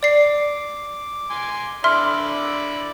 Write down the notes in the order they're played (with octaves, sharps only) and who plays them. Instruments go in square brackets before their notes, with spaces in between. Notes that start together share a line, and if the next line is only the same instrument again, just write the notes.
[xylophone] D5 C7 [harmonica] D6
[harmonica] G#5 C6 D6
[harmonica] D3 E4 D5 [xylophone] E5 C6 F6